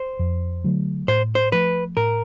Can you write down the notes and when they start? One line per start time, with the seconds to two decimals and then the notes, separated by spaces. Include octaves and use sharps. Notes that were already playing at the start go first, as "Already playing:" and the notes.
Already playing: C5
0.19 F2
0.64 D3 F#3 A3
1.08 A2 C5
1.35 C5
1.52 F3 A3 B4
1.97 A2 A#4